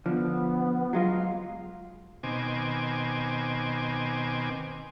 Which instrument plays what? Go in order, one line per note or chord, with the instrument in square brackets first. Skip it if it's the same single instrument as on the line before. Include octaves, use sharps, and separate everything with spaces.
[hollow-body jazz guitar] D3 F3 [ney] B3
[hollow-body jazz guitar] F#3 G#3 F4 [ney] F5
[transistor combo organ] B2 D#3 C4 G#5 D6